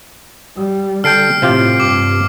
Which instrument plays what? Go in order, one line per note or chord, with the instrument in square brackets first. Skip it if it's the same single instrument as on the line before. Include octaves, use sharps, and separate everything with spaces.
[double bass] G3
[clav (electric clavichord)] D3 A4 G5 [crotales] F6 C7 D7
[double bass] A2 [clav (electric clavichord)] C3 F4 G4
[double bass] G2 [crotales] D6